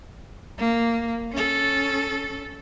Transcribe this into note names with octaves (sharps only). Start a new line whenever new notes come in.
A#3
C#4 A4